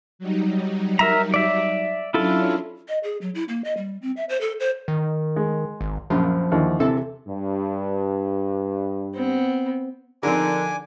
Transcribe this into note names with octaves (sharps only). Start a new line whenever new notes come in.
F#3 G3 D#4
A#4 E5 A#5
D5 E5
F#3 C#4 D4 E4 F4 A4
D#5
G#4
F#3
E4
A#3
D#5
G3
C4
E5
C5
A4
C5
D#3
G#3
G#1
A#1 F#2 F3
D#2 D3 E3
C3 E3 A4
G2
B3 C4
D3 F3 C4 D#4 G#4 A#4 G#5 D6